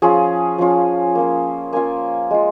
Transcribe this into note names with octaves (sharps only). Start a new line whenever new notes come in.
F3 C#4 F4 G#4
F3 C#4 F4
A#3 C#4 F4
A#3 C#4 F4 G#5
G#3 F4